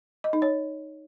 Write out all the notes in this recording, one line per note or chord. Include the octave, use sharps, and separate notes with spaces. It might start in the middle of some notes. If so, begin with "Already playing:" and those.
D#5
D#4
C#5